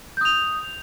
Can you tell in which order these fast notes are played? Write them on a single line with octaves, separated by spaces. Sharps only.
G6 D#6 F7